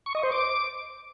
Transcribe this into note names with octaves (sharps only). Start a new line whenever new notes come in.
C#6
D#5
C5
D6